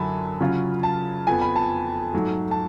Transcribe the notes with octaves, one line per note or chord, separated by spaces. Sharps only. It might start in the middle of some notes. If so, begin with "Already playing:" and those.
Already playing: F#2 D3 F#3 G#5 A5 B5
C#3 F#3 C#4 F4
A5
F2 F3 B3 G#5
B5
A5
G#2 F#3 A3
A5